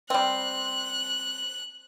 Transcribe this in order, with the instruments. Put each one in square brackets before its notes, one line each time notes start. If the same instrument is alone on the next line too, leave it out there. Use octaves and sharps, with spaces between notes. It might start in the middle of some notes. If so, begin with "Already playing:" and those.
[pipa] G3 C4 [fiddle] F#6